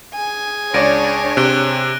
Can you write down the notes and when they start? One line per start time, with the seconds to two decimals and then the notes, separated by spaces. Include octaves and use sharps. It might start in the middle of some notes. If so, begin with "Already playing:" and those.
0.14 G#4 G#5
0.74 C#2 D4 C#5 D5 A#6 D7 D#7
1.37 C3 F#6 D7 G7